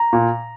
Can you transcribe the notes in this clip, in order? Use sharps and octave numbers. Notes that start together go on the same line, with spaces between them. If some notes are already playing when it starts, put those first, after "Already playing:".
Already playing: A#5
A#2